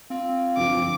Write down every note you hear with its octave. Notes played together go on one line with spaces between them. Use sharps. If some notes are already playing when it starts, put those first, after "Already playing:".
C4 F4
G1 F3 D6